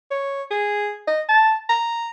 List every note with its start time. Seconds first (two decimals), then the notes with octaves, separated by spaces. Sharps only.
0.11 C#5
0.51 G#4
1.07 D#5
1.29 A5
1.69 A#5